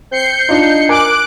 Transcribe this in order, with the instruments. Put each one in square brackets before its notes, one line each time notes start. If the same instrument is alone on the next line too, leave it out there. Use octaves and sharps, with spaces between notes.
[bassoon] C4 [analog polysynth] G6 C7 C#7
[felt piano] D4 F4 [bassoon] D#4
[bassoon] A#4 [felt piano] G#5 [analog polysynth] D6 F#6 D7